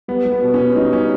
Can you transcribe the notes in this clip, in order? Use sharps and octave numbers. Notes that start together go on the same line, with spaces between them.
G3 B3
G3
B3
B2
C#4
B2
G3 D#4
G3 C#4